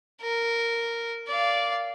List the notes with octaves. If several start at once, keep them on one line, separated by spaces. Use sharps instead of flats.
A#4
D5 F5